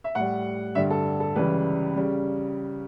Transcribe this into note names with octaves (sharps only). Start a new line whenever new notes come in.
E5
A2 G3 F#5
G2 D3 G3 E5
A4
A4
C#2 C#3 E3 G3 B4
C#3 G3